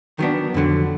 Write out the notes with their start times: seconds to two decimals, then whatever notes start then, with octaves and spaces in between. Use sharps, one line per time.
0.19 D#3 F#3 B3 D4
0.54 F2 D3 F#3